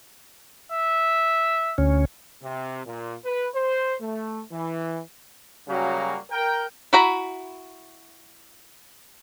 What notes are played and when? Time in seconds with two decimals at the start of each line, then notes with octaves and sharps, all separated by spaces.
0.72 E5
1.78 D2 C#4
2.42 C3
2.87 A#2
3.26 B4
3.55 C5
4.01 A3
4.52 E3
5.68 C#3 F#3 G3 A#3 C#4 F#4
6.30 A#4 G5
6.93 E4 F#4 A#5 B5